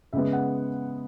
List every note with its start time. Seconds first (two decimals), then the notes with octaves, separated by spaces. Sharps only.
0.13 C#3 G#3 B3 E5
0.33 F#5